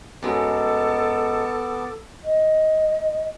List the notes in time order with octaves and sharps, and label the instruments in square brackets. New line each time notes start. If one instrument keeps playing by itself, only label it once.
[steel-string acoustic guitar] F#2 G#3 [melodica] B3 A5 D6 [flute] A4
[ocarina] D#5